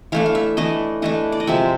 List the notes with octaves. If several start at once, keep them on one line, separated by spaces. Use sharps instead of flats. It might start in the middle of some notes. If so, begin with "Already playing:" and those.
E3 A3 D4 F5
F5
E5
E3 A3 D4 D#5
E3 A3 D4 D#5
D5
D#5
C3 F3 G#3 C4 E5